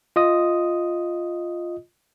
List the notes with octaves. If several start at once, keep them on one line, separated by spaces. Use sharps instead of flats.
F4 D#5 D#6